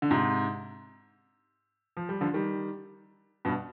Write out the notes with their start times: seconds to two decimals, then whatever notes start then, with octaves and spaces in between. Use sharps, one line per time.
0.02 D3
0.11 G#2 C3
1.97 F3
2.09 G3
2.21 D3 F3
2.34 D#3 G3
3.45 G2 B2